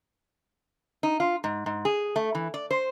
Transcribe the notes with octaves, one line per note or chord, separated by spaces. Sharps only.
D#4
F4
G#2
G#2
G#4
A3
E3
D5
C5